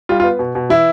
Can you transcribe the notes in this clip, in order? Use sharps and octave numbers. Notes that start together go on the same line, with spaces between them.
G3 F4
F4
B3
B2
B2
E3 E4